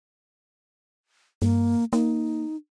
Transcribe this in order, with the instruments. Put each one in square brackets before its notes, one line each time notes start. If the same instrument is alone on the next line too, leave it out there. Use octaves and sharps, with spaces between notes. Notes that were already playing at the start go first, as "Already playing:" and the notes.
[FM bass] G2 [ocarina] A#3
[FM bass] A#3 [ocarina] D#4